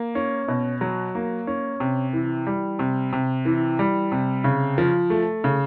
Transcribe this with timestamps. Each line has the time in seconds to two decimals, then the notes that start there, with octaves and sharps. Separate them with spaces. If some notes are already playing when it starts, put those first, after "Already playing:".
Already playing: A#3
0.15 C#4
0.48 B2
0.81 F#3
1.15 A#3
1.47 C#4
1.80 C3
2.13 E3
2.47 G3
2.79 C3
3.13 C3
3.45 E3
3.79 G3
4.12 C3
4.44 C#3
4.78 F3
5.10 A3
5.44 C#3